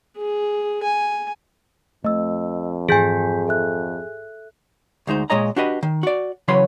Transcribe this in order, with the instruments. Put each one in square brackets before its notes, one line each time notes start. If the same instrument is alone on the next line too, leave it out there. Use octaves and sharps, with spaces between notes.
[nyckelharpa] G#4
G#5
[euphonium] F2 [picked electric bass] A3 [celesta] D#5 E6
[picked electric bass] G#2 E3 [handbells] G#4 G#5 [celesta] G6 B6
[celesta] A4 E5 F#6
[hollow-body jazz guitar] D2 G#3 D#4 C5
A#2 G#3 C#5 D#5 A#5
D4 F#4 G4 B4 D#5
D#3
F#4 D5
C#3 E3 F#3 B4 C#5 C6